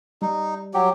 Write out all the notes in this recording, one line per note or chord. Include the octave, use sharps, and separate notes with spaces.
G3 D#4
F#3 G4